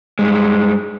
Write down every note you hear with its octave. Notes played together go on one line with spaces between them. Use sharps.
G2 G#3